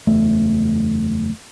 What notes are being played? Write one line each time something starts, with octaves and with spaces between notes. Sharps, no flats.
F#1 E2 A3